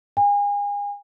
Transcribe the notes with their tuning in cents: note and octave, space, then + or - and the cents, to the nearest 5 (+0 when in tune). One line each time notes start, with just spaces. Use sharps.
G#5 -35